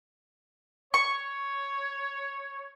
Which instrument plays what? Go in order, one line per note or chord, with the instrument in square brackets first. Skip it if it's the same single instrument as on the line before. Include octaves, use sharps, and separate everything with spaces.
[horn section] C#5 [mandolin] C#6